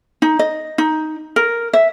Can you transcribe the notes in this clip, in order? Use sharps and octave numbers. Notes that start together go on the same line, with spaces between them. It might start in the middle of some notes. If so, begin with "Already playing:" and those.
D#4
D#5
D#4
A#4
E5